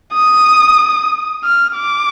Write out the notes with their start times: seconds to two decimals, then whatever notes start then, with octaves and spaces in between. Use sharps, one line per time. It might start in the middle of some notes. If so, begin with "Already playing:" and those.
0.13 D#6
1.44 F6
1.77 D6